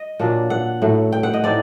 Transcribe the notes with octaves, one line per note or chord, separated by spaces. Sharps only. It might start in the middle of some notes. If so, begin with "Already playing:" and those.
Already playing: D#5
A#2 F#3 A#3 D4
F#5
A2 F#3 A3
G5
F#5
D#5
A2 A3 C4 D#4 D5